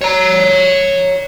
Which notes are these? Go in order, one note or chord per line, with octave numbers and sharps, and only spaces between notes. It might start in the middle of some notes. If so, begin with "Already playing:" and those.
C#5 A#5